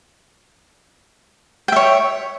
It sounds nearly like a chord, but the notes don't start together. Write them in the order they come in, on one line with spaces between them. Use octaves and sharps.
G5 E5 C#5